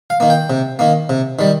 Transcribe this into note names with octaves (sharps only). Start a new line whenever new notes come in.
F5
D#3 A#3
G5
C3
D#3 A#3
C3
D#3 G3